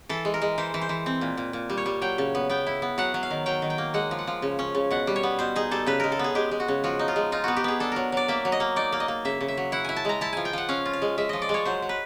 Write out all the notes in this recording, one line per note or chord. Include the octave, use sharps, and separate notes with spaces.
E3 A4
G#3
A#4
G#3
E3 C5
E3
C5
E3
C4
A#2
A#2
A#2
G3
C#5
G3
F#3 G5
C#3
B3
B3 G5
E4
B3
F#3 F#5
F#3
F5
D#3
F#3 G5
D#3
G5
A#3
G#3 F#5
F3
F#5
F3
C#3
C#4
C#3
B2 F#5
G3
C#5
B3
B2 C5
D#4 G#4
G3 A4
C#3 B4
G#3 A#4
A4
B3 G#4
G#3 G4
G#3
F#4
C#3
F3 F#4
D#4
F4
G#3
D#4 F4
B3 F#4
G4
B3 G#4
D4 A4
F#3 A#4
F#3 D5
A#3 E5
F#3
D#5
A#3
D#4 D5
A#3
D#5
A#3
C#3 E5
C#3
E5
F#3
E4 F#5
E4 G#5
A5
G#3 A#5
E4 A5
F3 G#5
G5
F3 F#5
C#4 F5
F4
F5
G#3
G#3 E5
F3 D#5
D5
G#3
C#5
F#3 C5
F#3
B4